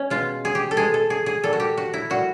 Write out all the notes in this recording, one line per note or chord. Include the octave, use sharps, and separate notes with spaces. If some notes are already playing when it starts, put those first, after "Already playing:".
Already playing: C#4
B2 G#3 F4
G#4
G4
A4
B2 G#3 G#4
A4
G#4
G#4
A#2 G3 A4
F#4
G4
F#4
E4
A#2 G3 F#4